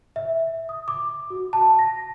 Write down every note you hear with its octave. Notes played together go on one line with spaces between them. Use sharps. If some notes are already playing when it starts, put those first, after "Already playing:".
E5
D#6
D6
F#4
A5
A#6